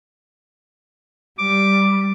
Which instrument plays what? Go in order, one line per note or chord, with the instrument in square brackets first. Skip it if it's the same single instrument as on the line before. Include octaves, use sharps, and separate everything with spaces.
[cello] G3 [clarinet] D6